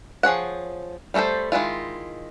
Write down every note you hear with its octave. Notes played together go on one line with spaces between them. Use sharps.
F3 G#4 C#5 F#5
G3 A3 F4 A4 C5
D#3 G#3 E4 F4